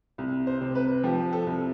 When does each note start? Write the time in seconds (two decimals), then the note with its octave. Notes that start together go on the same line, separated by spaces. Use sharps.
0.18 C2
0.47 C5
0.61 C3
0.75 B4
1.03 F3 G4
1.33 A4
1.47 C2